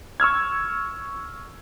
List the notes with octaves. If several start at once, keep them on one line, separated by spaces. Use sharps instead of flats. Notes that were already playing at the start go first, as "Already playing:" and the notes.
C#6 E6 F6 G#6